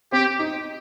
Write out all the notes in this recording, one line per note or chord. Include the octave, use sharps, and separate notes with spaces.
C4 G4
D#4